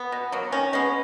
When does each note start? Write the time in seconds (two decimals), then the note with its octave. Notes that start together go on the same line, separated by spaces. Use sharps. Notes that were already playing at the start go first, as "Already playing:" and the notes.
Already playing: B3
0.12 B2
0.32 F#3 A#3
0.52 D#3 C#4
0.73 G#3 B3 C#4